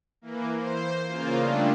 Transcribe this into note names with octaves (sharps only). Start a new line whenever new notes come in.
E3 A#3
C5
C#3 A#3 F4
G3 A3 D4